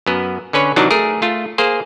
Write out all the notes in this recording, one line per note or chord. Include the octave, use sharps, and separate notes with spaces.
F#2 B3
D3 C#4 B4 C#5
C3 D#3 E3 F#3 D4 D#4
A3 G#4 A#4
A3 F4
A#3 G#4 C5